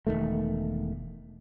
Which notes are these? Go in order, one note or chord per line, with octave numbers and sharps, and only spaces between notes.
E1 E2 D#3 A3